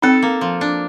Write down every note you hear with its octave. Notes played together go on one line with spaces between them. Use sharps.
C4 D#4 A4
A#3
F3
D4